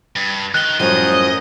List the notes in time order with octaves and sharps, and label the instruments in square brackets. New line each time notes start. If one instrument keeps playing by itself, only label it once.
[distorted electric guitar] G2
[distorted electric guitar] D#3 [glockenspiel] F#6 G7
[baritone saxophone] F#2 [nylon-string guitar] A2 F3 G3 [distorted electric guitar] D#5